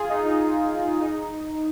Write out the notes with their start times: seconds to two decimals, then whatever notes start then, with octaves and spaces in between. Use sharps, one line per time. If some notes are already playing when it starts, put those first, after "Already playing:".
Already playing: F4 G#4
0.09 D#4
0.24 D#4
1.00 D#4